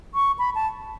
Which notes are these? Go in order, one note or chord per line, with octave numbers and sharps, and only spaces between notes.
C#6
B5
A5